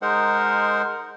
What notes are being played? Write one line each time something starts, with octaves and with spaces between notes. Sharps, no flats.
G#3 D#4 A#4 C5 F#5